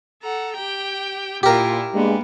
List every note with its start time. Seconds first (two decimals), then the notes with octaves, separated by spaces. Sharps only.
0.23 A4 F#5 A#5
0.55 G4 G5
1.43 A#2 E4 F4 G4 A#4
1.93 G2 G3 G#3 A#3 B3